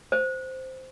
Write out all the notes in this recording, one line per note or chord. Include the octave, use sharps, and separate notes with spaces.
C5